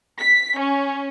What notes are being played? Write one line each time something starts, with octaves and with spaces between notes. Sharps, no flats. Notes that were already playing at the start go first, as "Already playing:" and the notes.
B6
C#4